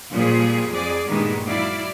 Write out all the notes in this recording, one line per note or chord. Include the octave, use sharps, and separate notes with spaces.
A#2 F3 G3 G#4
F2 G#4 D5
G2 A#2 D#3 G#3 B3
F#3 E4 D5 F5